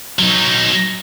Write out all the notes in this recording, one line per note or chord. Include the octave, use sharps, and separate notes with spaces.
F#3 D#4